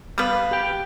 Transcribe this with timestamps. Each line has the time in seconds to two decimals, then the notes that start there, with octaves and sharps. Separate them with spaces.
0.18 G3 B3 B4 F5
0.51 G4 G5